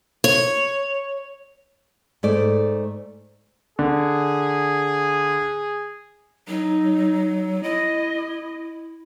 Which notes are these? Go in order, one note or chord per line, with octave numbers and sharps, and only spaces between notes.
C#5
G#2 A3 D5
D3 G#4
F#3 D#4
E4 D#5